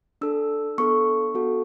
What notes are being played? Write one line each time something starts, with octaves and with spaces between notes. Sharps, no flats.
D4 A4 E6
B3 D4 A4 C#6
B3 F#4 A4